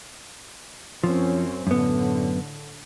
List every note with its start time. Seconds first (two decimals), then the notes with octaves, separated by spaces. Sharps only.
1.04 F#2 F3 C4 C#4
1.67 F#2 A2 D3 B3